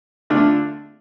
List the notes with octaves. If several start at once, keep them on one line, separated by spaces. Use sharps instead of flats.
D3 A3 D4 F4